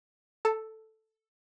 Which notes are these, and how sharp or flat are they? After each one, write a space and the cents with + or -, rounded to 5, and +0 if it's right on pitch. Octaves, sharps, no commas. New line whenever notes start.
A4 +0 A5 +25